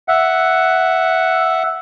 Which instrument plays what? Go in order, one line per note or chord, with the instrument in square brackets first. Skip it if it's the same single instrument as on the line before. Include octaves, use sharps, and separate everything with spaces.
[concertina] E5 F#5